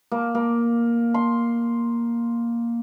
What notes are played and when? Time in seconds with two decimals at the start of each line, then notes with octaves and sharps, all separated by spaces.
0.12 A#3
0.35 A#3
1.14 C6